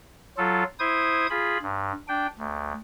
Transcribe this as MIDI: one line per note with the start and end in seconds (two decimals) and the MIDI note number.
0.38 0.64 54
0.38 0.64 65
0.38 0.64 69
0.79 1.27 64
0.79 1.27 72
0.79 1.27 87
0.79 1.27 92
1.30 1.58 65
1.30 1.58 68
1.30 1.58 83
1.62 1.92 43
2.08 2.27 62
2.08 2.27 79
2.38 2.73 38